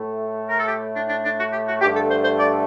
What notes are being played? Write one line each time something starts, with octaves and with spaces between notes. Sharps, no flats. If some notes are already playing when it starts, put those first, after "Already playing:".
Already playing: A2 A3
A#4
A4
G4
D4
D4
D4
F#4
G4
F#4
G2 D3 A3 G4
A4
C5
C5
D5